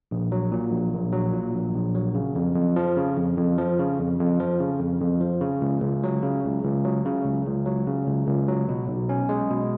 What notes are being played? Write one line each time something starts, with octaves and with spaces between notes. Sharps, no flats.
A#1
F#3
A#2
A#1
A#1
F#3
A#2
A#1
A#1
F#3
C#3
F2
F2
F3
C#3
F2
F2
F3
C#3
F2
F2
F3
C#3
F2
F2
F3
C#3
C#2
C#2
F#3
C#3
C#2
C#2
F#3
C#3
C#2
C#2
F#3
C#3
C#2
C#2
F#3
B2
B1
C#4
G#3
B2